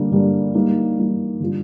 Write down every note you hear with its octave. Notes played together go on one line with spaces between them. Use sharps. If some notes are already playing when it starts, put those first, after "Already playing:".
Already playing: D3 G3 A#3 D4
D3 G3 A#3 D4
G3 A#3 D#4
G3 A#3 D#4
D3 G3 D4 F4